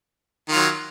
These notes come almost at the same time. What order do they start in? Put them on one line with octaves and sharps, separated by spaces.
D#3 F4 F#3